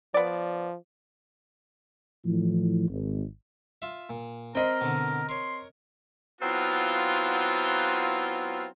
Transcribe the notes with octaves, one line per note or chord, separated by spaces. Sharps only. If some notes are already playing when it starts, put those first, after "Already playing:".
F3 B3 D5
A2 E3 F3
G#1
F4 E5
A#2
C4 A#4 D#5 G5 B5 C6
B2 D3
A#4 C#5 C6
F#3 B3 C4 E4 F4